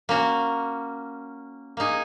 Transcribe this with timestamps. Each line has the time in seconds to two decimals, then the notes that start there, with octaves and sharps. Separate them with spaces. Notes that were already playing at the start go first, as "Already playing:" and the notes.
0.09 A#3 C#4 F#4
1.77 A#3 D#4 G#4